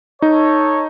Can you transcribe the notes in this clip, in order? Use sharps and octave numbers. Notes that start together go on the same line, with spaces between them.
D#4 A4 C#5